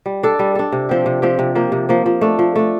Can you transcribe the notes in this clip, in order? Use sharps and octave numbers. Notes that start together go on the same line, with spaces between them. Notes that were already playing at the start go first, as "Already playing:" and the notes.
G3
D4 A4
G3
D4 A4
C3
F3 C4 G4
C3
F3 C4 G4
C3
F3 A#3
C3
F3 A#3
F3
A3 D4
F3
A3 D4